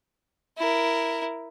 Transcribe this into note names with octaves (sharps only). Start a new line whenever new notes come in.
E4 A#4